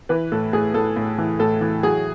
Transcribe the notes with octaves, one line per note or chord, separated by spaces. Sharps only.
E3 B4
A2 A4
A2 G#4
A2 A4
A2
E3
A2 A4
E3
F#3 G#4